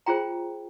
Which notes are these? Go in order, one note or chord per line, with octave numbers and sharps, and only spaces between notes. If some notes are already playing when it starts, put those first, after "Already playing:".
F4 G#4 C5 G5 A#5